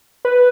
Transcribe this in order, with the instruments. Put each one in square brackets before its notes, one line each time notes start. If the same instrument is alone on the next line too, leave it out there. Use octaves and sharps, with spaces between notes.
[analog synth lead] B4